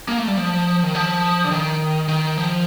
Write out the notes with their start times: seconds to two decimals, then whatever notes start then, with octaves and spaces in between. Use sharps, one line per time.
0.08 A#3
0.19 A3
0.28 G3
0.37 F3
0.83 D#3
0.95 F3
1.44 D3
1.51 D#3
2.08 D#3
2.37 F3